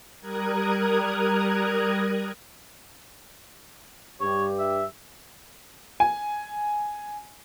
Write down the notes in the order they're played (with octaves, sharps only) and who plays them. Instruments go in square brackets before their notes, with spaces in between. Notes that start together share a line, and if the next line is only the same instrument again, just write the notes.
[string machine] G3 A#4 A#5 D#6 F#6 G#6
[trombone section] G2 G4 [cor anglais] C#5
[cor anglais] E5
[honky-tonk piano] G#5